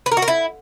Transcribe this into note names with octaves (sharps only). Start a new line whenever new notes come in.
B4
A#4
F#4
A#4
E4